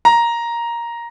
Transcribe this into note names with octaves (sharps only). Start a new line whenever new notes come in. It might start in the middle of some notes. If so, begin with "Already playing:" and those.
A#5